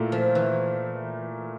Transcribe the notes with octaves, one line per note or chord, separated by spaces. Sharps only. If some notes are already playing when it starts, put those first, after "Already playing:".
Already playing: A#2 A3 E4 A#4
F3
E3